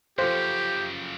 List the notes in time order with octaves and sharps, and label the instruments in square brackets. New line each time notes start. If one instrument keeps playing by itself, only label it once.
[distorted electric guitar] F#2 C#3 [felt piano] F3 A4 F5 [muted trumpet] G4 [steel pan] C5